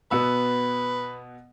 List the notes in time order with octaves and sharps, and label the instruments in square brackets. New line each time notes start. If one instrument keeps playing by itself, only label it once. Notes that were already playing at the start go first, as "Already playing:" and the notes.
[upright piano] B2 B3 E6 [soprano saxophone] B4